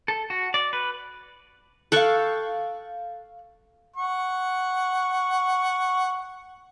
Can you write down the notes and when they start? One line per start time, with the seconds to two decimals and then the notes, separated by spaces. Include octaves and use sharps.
0.08 A4
0.30 F#4
0.54 D5
0.73 B4
1.92 A4 F5 G5 C#6 F#6
3.96 F#5 C#6